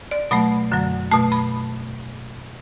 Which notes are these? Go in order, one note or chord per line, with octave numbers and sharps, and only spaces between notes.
D5
B2 F#3 A3 B5
F#2 D3 F#3
B2 A3 A5
B5